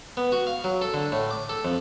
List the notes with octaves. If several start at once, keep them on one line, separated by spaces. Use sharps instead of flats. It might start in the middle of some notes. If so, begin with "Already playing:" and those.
B3
F#4
F5
F#3
A4
D3
A2
D6
A4
F2